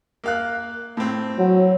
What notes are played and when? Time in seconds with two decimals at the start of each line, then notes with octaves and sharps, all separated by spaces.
0.24 A#3 F5 F#6
0.97 A2 C4
1.39 F#3